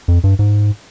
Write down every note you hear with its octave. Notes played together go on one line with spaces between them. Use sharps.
F2
G2
G#2